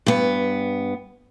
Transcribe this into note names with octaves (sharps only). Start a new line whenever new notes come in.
G2 B3